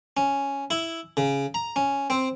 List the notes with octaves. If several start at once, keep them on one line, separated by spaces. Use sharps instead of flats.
C#4
E4
C#3
A#5
C#4
C4